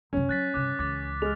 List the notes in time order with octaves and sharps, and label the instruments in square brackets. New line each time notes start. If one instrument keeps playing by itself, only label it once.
[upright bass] F#2 C3 [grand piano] C#4
[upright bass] F#3 [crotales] F#6 A6 B6
[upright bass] G2 C3 [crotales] D6 F#6
[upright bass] C#2 E3 [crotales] D6 A6
[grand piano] G#3 [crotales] F6 F7